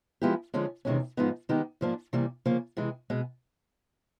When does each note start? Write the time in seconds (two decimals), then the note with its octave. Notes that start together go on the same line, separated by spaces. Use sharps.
0.21 F3 G#3 B3 E4 G4
0.54 D3 F3 G#3 C#4
0.85 E2 C3 D#3 G#3 C#4
1.17 G#2 F3 G#3 B3 D#4
1.49 D#3 G#3 B3 D#4 G4
1.81 G#2 F3 A#3 D4
2.13 C3 E3 G3 A#3
2.46 C#3 F3 A#3
2.77 C3 E3 G#3
3.10 B2 G#3